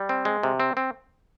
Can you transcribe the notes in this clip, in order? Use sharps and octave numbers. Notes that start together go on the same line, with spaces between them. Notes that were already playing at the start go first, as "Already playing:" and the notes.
Already playing: G3
C4
G#3
C3
C4
C4